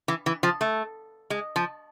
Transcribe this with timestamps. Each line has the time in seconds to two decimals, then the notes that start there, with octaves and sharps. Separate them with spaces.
0.08 E3
0.26 E3
0.43 F3
0.61 A3
1.30 G#3
1.56 F3